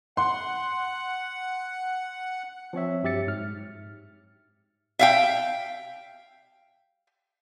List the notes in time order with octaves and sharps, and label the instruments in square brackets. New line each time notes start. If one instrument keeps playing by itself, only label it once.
[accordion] F#5 [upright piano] C6
[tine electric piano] F3 C4 C#5 E5
G2 F#3 G4 E5 A6 C#7
G#2 F6
[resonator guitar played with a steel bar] E5 F5 G5